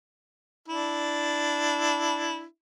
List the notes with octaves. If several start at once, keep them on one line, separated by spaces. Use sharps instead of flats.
D4 E4